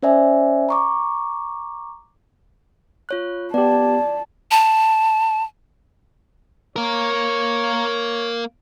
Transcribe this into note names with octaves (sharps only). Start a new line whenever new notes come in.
C#4 C5 D5 E5 G#5
A#5 C#6 D6
F4 C#5 F#6
B3 G4 D5 A5
A5
A#3 A#4 C#5